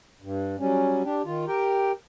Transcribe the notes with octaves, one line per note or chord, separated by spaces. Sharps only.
G2
F#3 G3 C#4
D4 G4
D#3 F4
G4 A#4 G5